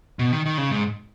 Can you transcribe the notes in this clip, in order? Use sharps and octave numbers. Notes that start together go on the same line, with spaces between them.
B2
D#3
D#3
C#3
G#2